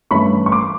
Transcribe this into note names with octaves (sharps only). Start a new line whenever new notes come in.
G2 E3 A3 C#4 B5 C#6
C#6
C6 D6